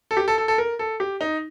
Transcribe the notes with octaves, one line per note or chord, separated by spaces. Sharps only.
A4
G4
A4
A4
A4
A#4
A4
G4
D#4